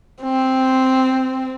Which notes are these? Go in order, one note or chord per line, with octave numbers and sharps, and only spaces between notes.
C4